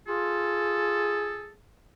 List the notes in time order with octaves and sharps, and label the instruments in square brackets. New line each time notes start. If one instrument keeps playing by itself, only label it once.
[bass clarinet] F4 [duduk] G#4 [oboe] A4